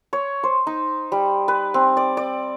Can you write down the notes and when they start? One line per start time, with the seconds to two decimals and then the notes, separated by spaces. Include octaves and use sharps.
0.13 C#5
0.43 C5
0.67 D#4
1.12 G3
1.48 B4
1.74 C4
1.97 D5
2.17 D5